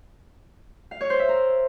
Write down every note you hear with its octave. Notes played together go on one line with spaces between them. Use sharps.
F5
C#5
C5
E5
A#4